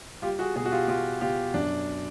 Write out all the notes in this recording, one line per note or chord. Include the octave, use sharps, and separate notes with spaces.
G3 F4 G4
F#4 G#4
B2 F#4 G#4
F#4
F4 G4
B2 F4 G4
B2 F4 G4
F#2 D4